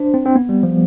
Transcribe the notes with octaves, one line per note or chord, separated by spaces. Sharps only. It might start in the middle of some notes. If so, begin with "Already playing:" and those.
Already playing: D4 C5
C4
C4
B3
G3
F3